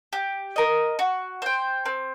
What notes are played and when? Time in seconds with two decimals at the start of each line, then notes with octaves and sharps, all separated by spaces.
0.13 G4
0.56 A#4 D#5
0.99 F#4
1.42 C5 G5
1.86 C4